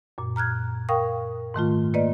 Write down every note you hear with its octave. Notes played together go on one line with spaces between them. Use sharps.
F#2 A#2
A#5 F6 F#6 G#6
A#4 F5 G5 C#6 D#6
G#2 D#3 A3 F4
A#3 B4 D5 D#5